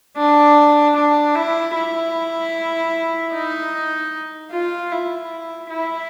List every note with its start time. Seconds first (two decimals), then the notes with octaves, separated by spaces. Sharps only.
0.17 D4
0.96 D4
1.35 E4
1.75 E4
3.33 D#4
4.52 F4
4.91 E4
5.70 E4